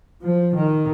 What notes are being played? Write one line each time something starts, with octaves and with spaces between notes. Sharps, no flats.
F3
D#3